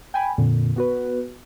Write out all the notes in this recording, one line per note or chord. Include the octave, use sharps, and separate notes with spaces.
G5 G#5 B5
F2 A#2 D3
B3 F#4 B4